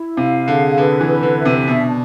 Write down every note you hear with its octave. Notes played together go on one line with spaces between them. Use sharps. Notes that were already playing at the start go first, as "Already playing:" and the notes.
Already playing: E4
C3 F5
D3 G#4
D3 B4
E3
B4
D3
E5
C3
B2 D4